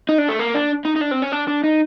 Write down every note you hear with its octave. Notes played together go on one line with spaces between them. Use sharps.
D#4
D4
A3
A#3
D4
D#4
D#4
D4
C4
C#4
D4
D4
D#4